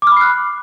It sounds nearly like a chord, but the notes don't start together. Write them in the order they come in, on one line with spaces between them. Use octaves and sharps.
D6 F6 B5 C7 F#6